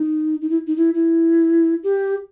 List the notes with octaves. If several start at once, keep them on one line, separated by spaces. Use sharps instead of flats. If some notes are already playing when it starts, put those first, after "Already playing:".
Already playing: D#4
D#4
E4
D#4
E4
E4
G4